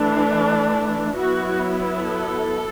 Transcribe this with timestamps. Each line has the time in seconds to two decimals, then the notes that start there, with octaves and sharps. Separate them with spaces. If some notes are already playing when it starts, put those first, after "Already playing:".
Already playing: E3 A3 D4
1.16 F#3 B3 E4 F#4
1.98 A4